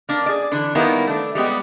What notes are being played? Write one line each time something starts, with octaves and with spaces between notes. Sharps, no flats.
A#3 D4
G#4 D5
D3 E3 D4
D#3 G3 A#3 B3 E4
A3 D4
G3 G#3 B3 G4